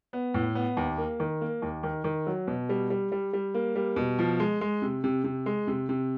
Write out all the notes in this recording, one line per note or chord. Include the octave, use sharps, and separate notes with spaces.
B3
A2
B3
D#2
A#3
D#3
A#3
D#2
D#3
D#3
F#3
B2
G3
G3
G3
G3
A#3
G3
B2
F3
G#3
G#3
C3
C3
C3
G#3
C3
C3